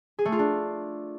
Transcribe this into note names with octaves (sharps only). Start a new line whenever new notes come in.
G#4
A3
F4
D4